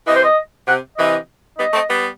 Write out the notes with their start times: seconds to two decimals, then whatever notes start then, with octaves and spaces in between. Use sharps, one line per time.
0.07 C3 E3 D#5
0.15 C5
0.24 D#5
0.67 C3 F#5
0.97 C3 E3 D#5
1.58 G3 B3 D#5
1.73 A3 C4
1.89 G3 B3